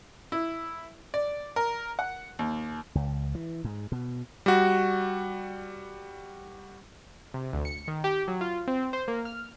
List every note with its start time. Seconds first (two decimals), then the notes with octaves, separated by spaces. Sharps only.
0.32 E4
1.14 D5
1.56 A#4
1.99 F#5
2.39 D#2
2.95 C#2
3.35 E3
3.64 G#2
3.92 B2
4.46 G3 F#4
7.34 C3
7.53 D2
7.65 C#7
7.88 D#3
8.04 G4
8.28 F#3
8.41 F4
8.68 C4
8.93 C5
9.08 A#3
9.25 F6